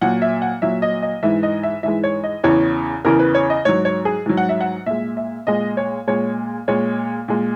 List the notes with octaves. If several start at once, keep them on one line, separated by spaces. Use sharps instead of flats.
A#2 F#3 F#5
E5
F#5
A#2 F#3 E5
D#5
D#5
G#2 E3 G#3 E5
D#5
E5
G#2 E3 G#3 E5
C#5
D#5
E2 C#3 E3 C#5
E2 C#3 E3 A#4
B4
C#5
D#5
G#2 F#3 C#5
C#5
G#4
G#2 F#3
F#5
E5
F#5
A#2 G#3 E5
E5
A#2 G#3 D#5
C#5
A#2 G#3 C#5
A#2 G#3 C#5
A#2 G#3